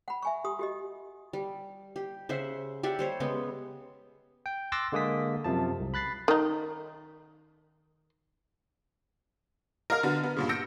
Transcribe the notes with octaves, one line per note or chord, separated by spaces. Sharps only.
F#5 B5
E5 G#5 C#6
G4 C6 D#6
F#4 G4 D#5
G3
G4
C#3 C5 E5 F#5
G4 D5 E5 F#5
G3 C5 C#5
C#3 G#3 B3
G5
C6 D6 E6 F#6 A6 A#6
D3 G#3 A#3 G#4 D#6 B6
F#2 C3 F3 A5
C2
B5 F#6 A6 B6 C7
D#3 D#4
A#4 D#5 F5 F6 A#6
D3 B3 F#4
B3
G2 A#2 C#3
E6 G6 A#6 C#7 D7